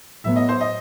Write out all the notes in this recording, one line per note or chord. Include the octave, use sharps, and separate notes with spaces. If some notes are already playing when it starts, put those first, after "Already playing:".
A2 F#3 B3 E5
D#5
C5
D#5